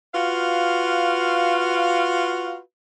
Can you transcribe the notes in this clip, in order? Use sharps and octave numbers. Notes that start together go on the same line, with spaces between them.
F4 F#4 B4 F5